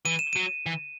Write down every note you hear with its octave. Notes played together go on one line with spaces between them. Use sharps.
E3 D#7
E7
F#3 D#7
E3